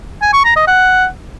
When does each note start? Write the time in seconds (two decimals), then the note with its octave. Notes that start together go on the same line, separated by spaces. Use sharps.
0.22 G#5
0.33 C#6
0.44 A#5
0.56 D#5
0.67 F#5